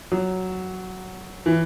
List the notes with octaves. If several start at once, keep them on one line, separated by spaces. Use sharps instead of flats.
F#3
E3